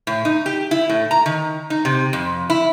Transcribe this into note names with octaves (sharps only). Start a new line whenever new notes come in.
A2
D#4
G4
E4
A2
A#5
D#3
D#4
C3
F2
E4